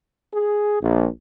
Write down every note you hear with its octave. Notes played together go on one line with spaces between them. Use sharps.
G#4
A#1